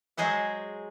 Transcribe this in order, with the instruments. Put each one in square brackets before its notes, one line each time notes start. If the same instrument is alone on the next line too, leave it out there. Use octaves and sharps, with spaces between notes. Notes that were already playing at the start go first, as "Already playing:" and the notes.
[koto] F#3 G#3 G#4 C5 F#5